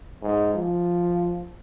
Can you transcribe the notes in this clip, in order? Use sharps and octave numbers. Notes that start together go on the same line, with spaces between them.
G#2
F3